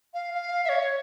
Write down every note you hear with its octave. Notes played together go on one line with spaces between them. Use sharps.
F5
F5
E5
C#5